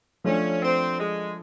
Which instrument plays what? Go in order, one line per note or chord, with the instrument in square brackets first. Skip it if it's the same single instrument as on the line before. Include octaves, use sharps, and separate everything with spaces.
[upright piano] F3 A3 D4 [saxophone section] C#4
[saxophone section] C4
G#3